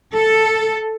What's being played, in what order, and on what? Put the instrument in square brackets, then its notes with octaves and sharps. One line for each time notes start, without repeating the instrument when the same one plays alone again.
[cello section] A4